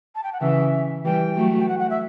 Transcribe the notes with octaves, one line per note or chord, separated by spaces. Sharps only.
A5
G5
F#5
C#3 E3 E5
E3 G3 G5
F#3 A3
G5
F#5
F#5
E5